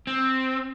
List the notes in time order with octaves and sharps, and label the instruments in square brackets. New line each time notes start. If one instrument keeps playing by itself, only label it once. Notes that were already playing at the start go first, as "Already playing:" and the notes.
[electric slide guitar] C4